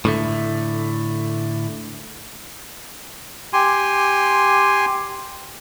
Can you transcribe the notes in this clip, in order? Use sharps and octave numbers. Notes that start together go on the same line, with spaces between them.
A2 D3 A3
G4 G#5 C6